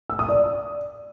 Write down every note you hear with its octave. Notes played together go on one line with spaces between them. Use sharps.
E6
D#6
D5